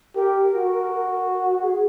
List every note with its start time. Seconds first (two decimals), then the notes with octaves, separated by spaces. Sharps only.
0.15 G4 A#4
0.53 F#4
1.62 G#4